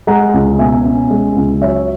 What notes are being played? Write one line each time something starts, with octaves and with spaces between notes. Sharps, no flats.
G#3 F#5 A#5
C#2
B2 E5 G#5
C#4
G#3
C#2
F#3 C#5 E5